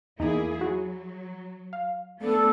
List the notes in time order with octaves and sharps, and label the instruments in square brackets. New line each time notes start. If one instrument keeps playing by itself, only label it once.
[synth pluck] E2 D#4 [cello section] A#3 E4 G#4
[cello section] F#3 [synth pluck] F#4
[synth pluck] F5
[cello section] A3 B3 D4 [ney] A4